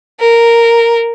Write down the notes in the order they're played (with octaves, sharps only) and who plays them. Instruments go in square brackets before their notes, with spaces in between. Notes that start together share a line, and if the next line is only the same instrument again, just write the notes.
[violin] A#4